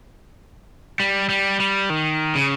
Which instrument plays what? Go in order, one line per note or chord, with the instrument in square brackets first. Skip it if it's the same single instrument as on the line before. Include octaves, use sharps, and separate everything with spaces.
[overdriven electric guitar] G3
G3
G3
D#3
C#3